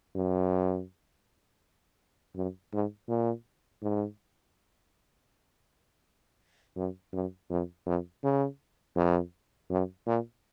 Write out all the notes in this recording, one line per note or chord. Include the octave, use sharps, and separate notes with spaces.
F#2
F#2
G#2
A#2
G#2
F#2
F#2
F2
F2
C#3
F2
F#2
A#2